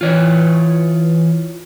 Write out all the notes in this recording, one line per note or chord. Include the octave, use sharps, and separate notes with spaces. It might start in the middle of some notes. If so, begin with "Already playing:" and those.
E3 F4 C#5 D5